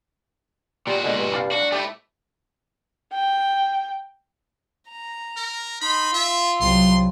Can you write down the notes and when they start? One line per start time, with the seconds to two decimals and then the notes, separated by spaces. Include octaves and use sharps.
0.87 A#2 G3 F#4
1.04 B2 D3 G#3
1.18 G2
1.32 C2 D5 F5
1.51 D4 F#4
1.72 A3 E4 G4 D5
3.12 G5
4.88 A#5
5.37 A#4
5.82 D#4 B5 C6
6.14 F4 E5
6.61 C2 F#3 C6